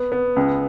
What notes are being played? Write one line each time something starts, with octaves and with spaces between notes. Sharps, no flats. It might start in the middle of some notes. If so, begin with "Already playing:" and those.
Already playing: B3
B3
C#2